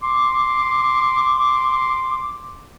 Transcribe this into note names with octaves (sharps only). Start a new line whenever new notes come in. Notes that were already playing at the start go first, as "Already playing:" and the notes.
C6 D6